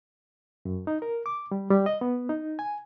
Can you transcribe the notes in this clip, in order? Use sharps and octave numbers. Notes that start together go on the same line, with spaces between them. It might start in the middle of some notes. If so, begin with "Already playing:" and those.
F#2
D#4
A#4
D6
G3
G3
D#5
B3
D#4
G#5